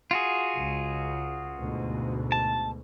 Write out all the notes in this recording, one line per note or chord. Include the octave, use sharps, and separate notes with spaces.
F4 F#4 G#4
C#2
D2 G#2 B2
A5